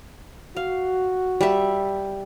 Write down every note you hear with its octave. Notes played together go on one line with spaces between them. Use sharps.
F#4 F5
G3 E5